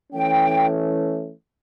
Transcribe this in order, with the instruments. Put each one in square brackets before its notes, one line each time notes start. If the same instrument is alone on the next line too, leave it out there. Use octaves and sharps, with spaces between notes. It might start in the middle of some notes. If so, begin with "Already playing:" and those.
[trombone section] E3 A3 C#4 [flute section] G5